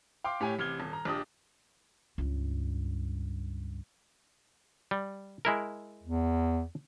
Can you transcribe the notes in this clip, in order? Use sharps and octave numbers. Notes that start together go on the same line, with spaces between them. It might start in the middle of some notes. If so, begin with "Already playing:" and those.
F5 G5 C6 D6
A2 G4 C#5 G#5
A1 C3 F6 G#6 G7
D#1
A#5
A#1 D4 G4 D#6
C#2 G2
G3
G#3 E4 A#4
E2